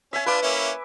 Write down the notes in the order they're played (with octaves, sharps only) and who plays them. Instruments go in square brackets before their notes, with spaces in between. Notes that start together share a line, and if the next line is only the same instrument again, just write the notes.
[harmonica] C#4 [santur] E5 G#5
[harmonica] D4 F4 [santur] B4 D6
[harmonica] A#3 C#4 E4